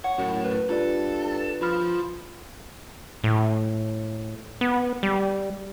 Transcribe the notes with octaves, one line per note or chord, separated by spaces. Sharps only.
C#5 F#5
F#2 A2
B4
G2 F4 A4 D5
F3 F4 B5 F6
A2
B3
G3